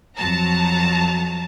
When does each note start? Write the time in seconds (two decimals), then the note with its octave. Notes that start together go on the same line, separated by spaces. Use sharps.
0.16 F2 F#3 A5 A#5